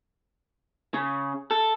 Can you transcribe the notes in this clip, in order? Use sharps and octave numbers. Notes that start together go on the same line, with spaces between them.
C#3
A4